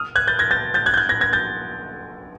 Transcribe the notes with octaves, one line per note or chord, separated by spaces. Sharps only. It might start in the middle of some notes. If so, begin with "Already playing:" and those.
Already playing: D#6 F6
F#6 G#6
G6 A6
G#6 A#6
G6 A6
G6 A6
F#6 G#6
G6
F#6 G#6
G#6 A#6
G#6 A#6
G6 A6